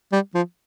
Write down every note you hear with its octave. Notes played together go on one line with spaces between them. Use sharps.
G3
F3